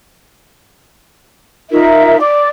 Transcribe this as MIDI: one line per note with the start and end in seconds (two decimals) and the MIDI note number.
1.71 2.19 63
1.71 2.19 65
1.71 2.19 70
1.71 2.19 76
2.20 2.49 74
2.20 2.49 86